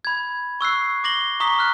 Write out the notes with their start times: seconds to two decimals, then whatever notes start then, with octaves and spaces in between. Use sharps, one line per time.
0.05 B5 G#6
0.61 C#6 E6 F#6 C7
1.04 D6 A#6 F#7 G7
1.40 A#5 C#6 D#6 B6 G7
1.59 F6 F#6